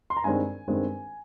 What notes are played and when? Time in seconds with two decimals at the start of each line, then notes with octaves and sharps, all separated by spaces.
0.10 C6
0.17 A#5
0.24 G2 D#3 G#3 C4 G#5
0.68 G2 D#3 G#3 C4